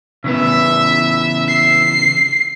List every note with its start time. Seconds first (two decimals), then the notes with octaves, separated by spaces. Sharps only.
0.24 C#3 E3 B3 E5
1.48 C7